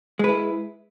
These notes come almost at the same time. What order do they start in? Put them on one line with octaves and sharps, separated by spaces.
G#3 B4 E4